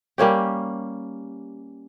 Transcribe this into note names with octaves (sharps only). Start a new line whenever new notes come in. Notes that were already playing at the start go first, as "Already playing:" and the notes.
G3 A#3 C#4 G4